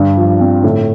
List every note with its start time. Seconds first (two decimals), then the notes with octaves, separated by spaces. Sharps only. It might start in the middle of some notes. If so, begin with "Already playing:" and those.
Already playing: G2 D4
0.17 F3
0.41 C4
0.64 A2